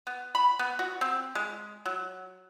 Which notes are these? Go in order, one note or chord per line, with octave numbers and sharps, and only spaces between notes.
B3
B5
B3
F#4
C4
G#3
F#3